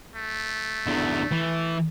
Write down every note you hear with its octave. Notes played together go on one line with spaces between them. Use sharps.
A3
E2 D3
E3